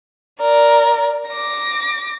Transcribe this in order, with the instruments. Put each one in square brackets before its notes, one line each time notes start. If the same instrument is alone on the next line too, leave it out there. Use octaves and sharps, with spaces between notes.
[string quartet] A#4 D5
D6 A#6